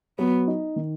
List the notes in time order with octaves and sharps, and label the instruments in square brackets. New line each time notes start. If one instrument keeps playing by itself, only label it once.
[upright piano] F#3 [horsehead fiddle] B3
[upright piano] D#4
D#3